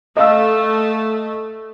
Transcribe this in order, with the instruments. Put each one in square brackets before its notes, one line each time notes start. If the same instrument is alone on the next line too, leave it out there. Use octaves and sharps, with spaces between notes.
[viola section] A3 [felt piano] D#5 F5 E6